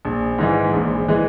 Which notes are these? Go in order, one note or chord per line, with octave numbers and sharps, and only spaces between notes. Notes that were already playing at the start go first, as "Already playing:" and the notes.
A#1
G#2 E3 G#3
A#1
E3 G#3